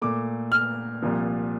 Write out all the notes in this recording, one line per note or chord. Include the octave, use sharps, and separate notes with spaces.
A#2 A3 D6
F6
C2 A#2 F3